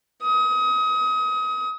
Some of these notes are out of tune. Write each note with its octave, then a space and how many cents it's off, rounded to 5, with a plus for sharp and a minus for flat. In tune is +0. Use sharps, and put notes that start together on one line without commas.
D#6 +30